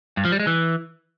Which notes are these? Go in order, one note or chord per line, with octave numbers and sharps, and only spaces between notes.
G2
F3
G3
G#3
E3